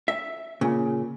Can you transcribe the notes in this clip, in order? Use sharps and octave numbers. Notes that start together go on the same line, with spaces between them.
E5
A#2 C#3